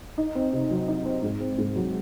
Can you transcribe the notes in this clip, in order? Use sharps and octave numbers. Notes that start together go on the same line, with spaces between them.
D#4
C4
C3
F#3
D#4
C4
G#2
C4
G#2
F#3